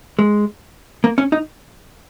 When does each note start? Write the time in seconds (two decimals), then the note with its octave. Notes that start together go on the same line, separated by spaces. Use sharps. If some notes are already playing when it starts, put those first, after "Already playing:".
0.19 G#3
1.04 A#3
1.18 C#4
1.32 D#4